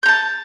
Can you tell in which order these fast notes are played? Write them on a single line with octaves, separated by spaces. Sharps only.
G6 A#5 A5